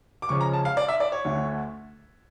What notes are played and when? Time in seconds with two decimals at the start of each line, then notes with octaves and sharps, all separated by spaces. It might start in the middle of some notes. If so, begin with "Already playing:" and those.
0.22 D6
0.29 C#2 C#3 F3 C#4 C#6
0.41 A#5
0.53 A5
0.65 F5
0.77 D5
0.88 E5
1.00 D5
1.12 C#5
1.25 D2 D3 A3